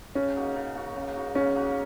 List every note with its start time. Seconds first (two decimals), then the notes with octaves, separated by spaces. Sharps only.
0.15 C#3 C#4
0.36 A#3 D#4 F#4
0.56 C#3
0.75 A#3 D#4 F#4
0.96 C#3
1.14 A#3 D#4 F#4
1.34 C#3 C#4
1.55 A#3 D#4 F#4